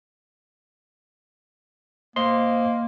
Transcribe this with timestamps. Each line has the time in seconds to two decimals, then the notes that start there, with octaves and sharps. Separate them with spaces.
2.16 A#3 C5 D#5 C6